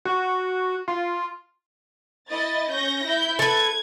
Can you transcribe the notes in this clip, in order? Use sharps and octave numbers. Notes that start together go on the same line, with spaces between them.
F#4
F4
E4 D#5 A6
C#4 G6 A#6
E4 G6
A4 B4 G#6